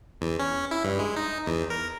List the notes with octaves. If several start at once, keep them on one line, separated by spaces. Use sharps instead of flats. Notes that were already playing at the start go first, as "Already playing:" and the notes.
E2
C#4
E4
G2
G#3
D#4
E2
A#4